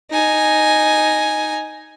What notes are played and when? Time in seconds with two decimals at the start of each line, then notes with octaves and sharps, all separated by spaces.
0.11 D#4 G#5